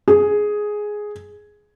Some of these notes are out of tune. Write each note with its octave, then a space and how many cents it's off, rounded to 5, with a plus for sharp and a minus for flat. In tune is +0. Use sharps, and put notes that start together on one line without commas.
G#4 +5